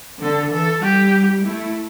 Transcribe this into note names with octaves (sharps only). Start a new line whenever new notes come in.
D3 A4
E3 A4
G3 G4
A3 E4